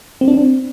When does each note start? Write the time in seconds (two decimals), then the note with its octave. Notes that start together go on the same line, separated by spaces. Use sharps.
0.21 C4
0.28 D4
0.34 C4